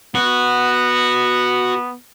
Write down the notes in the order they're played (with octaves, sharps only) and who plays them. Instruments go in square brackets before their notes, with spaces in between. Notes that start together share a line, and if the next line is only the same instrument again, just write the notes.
[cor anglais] B3 [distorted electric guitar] F#4